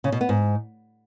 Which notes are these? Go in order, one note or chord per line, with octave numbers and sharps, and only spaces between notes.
C#3
B2
B3
G#2